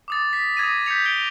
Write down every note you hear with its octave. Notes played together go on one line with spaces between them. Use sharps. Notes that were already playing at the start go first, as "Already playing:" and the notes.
D6 D#6 A6
B6
D#6 G#6 A#6 D#7
G6 A6 B6 C#7 F7
G#6 D7 F7 G7